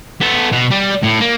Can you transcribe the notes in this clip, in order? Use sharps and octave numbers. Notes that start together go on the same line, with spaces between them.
B3 A4
B2
G3
A2
A#3